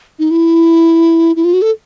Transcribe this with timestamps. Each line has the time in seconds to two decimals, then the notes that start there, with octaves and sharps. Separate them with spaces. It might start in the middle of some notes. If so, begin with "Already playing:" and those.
0.19 D#4
0.31 E4
1.36 E4
1.44 F4
1.53 F#4
1.62 A4